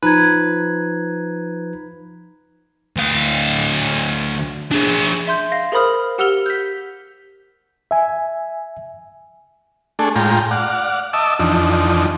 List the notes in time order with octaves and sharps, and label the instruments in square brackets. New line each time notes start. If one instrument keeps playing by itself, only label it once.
[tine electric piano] F3 B4 [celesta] D#4 A#5 G#6
[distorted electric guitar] D2 F5
D4 G#4
[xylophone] E5 C6 G6
F5 A#6
G#4 A#4 C5 B5 D#6 F6
G4 F#5 E6 F6 F7 G7
G6 B6
[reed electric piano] E5 G#5
[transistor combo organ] A3 D4 G#4 A4
A2 G#3 F4 G5 A#5
D5 F5 F#5
D#5 E5 A5 D6 E6
F2 E3 F3 D4 D#4